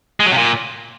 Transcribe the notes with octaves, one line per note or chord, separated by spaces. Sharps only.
G#3
F#3
C3
A#2